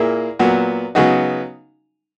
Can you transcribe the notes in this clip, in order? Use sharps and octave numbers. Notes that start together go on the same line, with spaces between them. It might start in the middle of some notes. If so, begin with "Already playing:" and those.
Already playing: A#2 A#3 E4 G#4
A#2 F#3 B3 F#4
C#3 F#3 B3 D#4 F#4